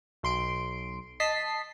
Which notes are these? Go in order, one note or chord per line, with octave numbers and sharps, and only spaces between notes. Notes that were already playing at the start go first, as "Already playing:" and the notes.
B1 C6 D7
D#5 A5 B6 C7